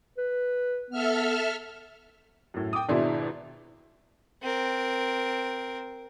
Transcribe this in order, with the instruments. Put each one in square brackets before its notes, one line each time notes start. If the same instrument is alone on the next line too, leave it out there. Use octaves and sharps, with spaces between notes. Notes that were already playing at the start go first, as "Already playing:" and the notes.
[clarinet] B4
[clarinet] B3 [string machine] A4 E5 F6
[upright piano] F#2 A2
G5 D6 D#6
G#1 B2 D4 E4 G#4 C6
[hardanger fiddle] C4 A#4